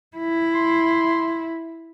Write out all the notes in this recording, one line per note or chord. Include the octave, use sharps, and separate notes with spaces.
E4
C6